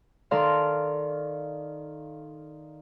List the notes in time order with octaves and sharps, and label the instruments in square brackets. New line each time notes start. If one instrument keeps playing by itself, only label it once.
[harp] D#3 D#4 A4 D5 F5 C6